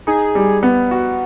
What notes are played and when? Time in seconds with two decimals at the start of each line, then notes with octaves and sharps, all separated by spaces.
0.07 D#4 G#4
0.35 G3
0.63 B3
0.91 F#4